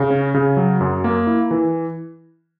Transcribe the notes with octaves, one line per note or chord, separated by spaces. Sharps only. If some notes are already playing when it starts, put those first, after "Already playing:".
Already playing: C#3
C#4
C#3
F#3
F#2
A#3
E4
E3